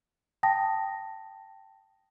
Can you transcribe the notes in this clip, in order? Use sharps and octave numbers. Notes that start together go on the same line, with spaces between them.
G5 A5 D#6 A#6